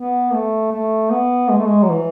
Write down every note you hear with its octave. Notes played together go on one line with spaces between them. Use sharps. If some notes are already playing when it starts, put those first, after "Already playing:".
Already playing: B3
A3
A3
B3
G#3
A3
G#3
F#3
E3